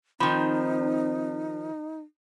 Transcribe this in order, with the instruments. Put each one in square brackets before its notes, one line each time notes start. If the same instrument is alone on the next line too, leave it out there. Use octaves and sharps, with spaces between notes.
[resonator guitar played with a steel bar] D#3 F3 [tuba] C4 [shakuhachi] D#4 [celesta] B5